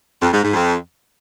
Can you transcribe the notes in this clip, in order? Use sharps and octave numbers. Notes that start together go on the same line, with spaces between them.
F2
G#2
G#2
F2